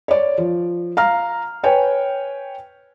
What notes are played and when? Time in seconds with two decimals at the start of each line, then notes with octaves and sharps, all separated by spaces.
0.08 C#5 D5
0.38 F3
0.97 F5 A#5 F6
1.63 B4 C#5 G5 G#5